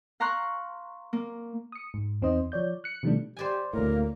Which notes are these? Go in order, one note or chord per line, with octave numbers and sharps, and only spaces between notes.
F5 A#5 C6 C#6 F#6
A#3
D#6 C#7
G#2
E2 C4 D#4 C5 D#5
F3 C#5 D5 G6
F#6 C#7
B2 D#3 F3 G3 A3 D4
G4 C5 D5 G#5
D2 A2 A#3 A#4